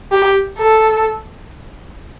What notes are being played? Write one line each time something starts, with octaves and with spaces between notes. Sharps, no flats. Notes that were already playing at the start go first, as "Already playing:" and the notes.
G4
A4